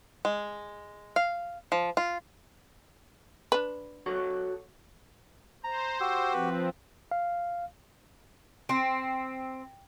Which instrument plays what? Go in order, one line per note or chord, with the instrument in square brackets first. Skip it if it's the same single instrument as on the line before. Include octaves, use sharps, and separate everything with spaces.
[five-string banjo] G#3
F5
F3
F4
[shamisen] D4 B4
[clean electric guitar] F#4 A4 C#5
[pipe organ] C5 [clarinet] A#5
[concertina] F#4 G4 [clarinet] E6
[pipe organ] F3 C4 [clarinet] B4
[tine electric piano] F5
[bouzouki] C4